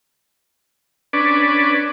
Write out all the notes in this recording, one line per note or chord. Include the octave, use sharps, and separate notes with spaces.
C#4 D4 B4 D5